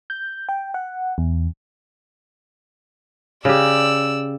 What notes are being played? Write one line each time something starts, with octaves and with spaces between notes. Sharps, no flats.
G6
G5
F#5
E2
C#3 G4 D5 E6